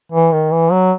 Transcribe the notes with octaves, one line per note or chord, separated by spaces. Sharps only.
E3
D#3
E3
F#3